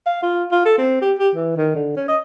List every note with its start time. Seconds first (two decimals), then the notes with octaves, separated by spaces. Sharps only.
0.06 F5
0.23 F4
0.52 F4
0.65 A4
0.78 C4
1.01 G4
1.18 G4
1.35 E3
1.57 D#3
1.75 D3
1.97 C#4
2.08 D#5